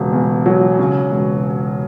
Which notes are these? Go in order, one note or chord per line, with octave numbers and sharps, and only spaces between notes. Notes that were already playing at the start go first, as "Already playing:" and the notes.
Already playing: E1 C#3
E2
F#3
C#3
E1